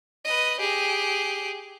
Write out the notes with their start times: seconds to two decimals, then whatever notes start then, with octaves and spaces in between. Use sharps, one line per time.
0.25 B4 D#5
0.60 G4 G#4